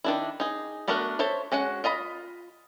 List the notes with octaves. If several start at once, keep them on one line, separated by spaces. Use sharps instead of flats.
D#3 D4 E4
D#4 G#4
A3 B3 D4 F#4 A#4
A4 C5 C#5 E5
G#3 C#4 F#4 F#5
F4 D#5 A#5 B5